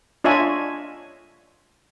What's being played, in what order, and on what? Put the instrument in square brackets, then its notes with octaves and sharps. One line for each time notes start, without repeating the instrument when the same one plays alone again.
[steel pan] D4 F4 C#5 D#5 E5 G#5